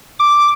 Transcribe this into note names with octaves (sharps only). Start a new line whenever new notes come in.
D6